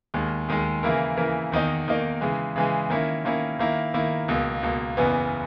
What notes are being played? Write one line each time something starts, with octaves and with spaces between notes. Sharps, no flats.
D#2 D#3 G#3
D#2 D#3 G#3
C#3 E3 A#3 E4 A#4
C#3 E3 A#3 E4 A#4
E2 D#3 A#3 D#4
E2 D#3 A#3 D#4
C#3 E3 G#3
C#3 E3 G#3
D#3 A#3 C#4 E4
D#3 A#3 C#4 E4
D#3 A#3 E4
D#3 A#3 E4
C#2 B2 A#3
C#2 B2 A#3
F#1 E2 C#3 E3 B3